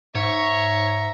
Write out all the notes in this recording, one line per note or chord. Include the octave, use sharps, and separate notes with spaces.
G#2 C#5 E5 A#5